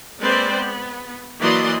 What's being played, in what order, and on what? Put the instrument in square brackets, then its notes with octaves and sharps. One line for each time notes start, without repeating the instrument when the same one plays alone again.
[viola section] G#3 A#3 C4 B4 C5 D5
B3
E3 F#3 A#3 D5 D#5 C6